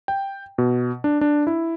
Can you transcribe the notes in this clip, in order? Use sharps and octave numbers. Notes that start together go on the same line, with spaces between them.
G5
B2
D4
D4
E4